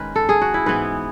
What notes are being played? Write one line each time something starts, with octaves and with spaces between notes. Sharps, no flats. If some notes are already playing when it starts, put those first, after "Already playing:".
Already playing: D#3 G#3 C#4 B4
A4
G#4
F#4
E4
G#2 E3 B3 B4